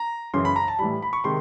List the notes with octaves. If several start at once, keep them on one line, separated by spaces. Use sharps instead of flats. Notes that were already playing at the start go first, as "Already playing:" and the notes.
Already playing: A#5
F#2 C#3 E3 C6
B5
A#5
A5
A2 E3 G3 B5
B5
C#6
C3 D#3 G#3 C6